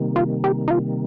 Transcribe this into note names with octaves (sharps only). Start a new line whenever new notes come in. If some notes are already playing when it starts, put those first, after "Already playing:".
Already playing: C3 D#3 G3 A#3
F4
G4
D#4
F4